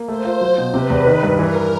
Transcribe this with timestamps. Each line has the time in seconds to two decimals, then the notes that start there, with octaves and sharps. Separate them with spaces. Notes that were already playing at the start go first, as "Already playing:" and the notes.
Already playing: A#3
0.08 A3 C5
0.25 F4
0.41 F#3
0.58 B2
0.74 C3 B4
0.90 E2
1.07 D#3
1.23 G2
1.38 E3 A#4